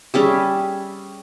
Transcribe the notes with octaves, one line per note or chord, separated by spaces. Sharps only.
G3 C#4 G#4 E5